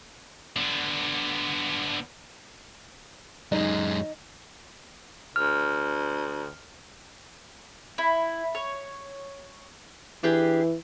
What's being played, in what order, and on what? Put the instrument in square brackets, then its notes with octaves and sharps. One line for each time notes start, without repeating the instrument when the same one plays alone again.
[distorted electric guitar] D3 B3
[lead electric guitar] F#2 G#3 [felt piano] D#4
[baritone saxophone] D2 [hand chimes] F6
[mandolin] E4
C#5
[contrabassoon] E3 [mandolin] D4 G4 G#4